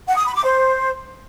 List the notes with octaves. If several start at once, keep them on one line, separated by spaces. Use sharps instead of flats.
F#5
D#6
B5
D6
C5